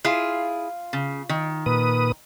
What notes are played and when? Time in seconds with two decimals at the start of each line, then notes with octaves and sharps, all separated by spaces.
0.05 E4 F4 G#4
0.93 C#3
1.29 D#3
1.66 A#2 B4 D#6